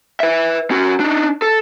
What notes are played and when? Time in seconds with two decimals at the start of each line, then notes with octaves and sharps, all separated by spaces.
0.20 B4 E5
0.71 C#4 F#4
1.00 D4 D#4
1.42 A4